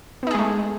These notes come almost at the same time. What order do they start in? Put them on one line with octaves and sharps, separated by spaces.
B3 D#4 G#4 G#3 A3